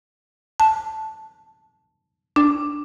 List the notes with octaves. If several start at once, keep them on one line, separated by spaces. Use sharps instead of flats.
A5
D4